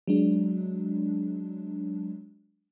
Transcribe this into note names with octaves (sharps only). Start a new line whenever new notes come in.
F#3 G#3 D4